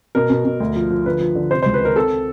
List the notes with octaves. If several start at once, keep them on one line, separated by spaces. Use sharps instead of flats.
B2 A#4
B2
B2
D2
F3
F3
D3 B4
F3
D3
C3 C5
C#2 C5
B4
D#3 A#4
C4 A4